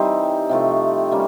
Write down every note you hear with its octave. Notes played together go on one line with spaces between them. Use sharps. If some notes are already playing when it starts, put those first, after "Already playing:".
Already playing: E3 G3 C4 D#4 G4
C3 F3 A3
G3 A#3 C#4